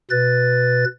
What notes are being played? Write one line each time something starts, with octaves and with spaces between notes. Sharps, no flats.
B2 B4 A6